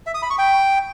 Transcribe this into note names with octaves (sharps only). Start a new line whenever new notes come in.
E5
D#6
B5
C#6
G5